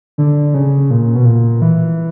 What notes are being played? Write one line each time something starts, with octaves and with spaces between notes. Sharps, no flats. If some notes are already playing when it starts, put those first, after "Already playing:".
D3
C#3
A#2
B2
A#2
E3